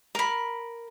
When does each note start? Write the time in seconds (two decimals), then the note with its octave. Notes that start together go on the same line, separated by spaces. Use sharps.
0.15 A#4 B5